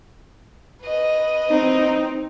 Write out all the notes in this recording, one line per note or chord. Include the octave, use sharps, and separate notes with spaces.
B4 D#5
C4 D#4